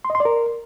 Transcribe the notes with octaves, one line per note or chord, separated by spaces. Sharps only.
C6
D#5
C6
D5
A#4